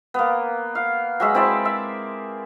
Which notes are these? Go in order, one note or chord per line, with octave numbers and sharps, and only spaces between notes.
A#3 B3
F5
F#3 G#3 E5
C4 E4 D5 E5
E5